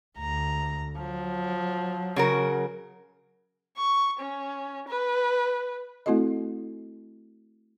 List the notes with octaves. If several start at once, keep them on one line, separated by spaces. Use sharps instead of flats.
D2 A#5
F3 F#3
C#3 F#4 A#4
C#6
C#4
B4
A3 C4 E4 F#4 A4 D#5